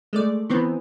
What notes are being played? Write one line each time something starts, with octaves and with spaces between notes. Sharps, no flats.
G#3 A3 D5
D#3 E3 B3 C4